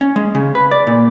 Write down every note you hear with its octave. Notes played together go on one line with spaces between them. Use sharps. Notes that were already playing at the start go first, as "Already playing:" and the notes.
C#4
G#3
C#3
B4
D5
A#2